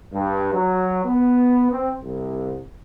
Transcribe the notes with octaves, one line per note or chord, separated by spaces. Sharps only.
G2
F#3
B3
C4
C2